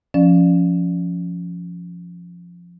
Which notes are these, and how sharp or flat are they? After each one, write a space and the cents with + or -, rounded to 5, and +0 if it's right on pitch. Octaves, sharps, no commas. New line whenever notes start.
F3 +0 C#4 +10 D5 +25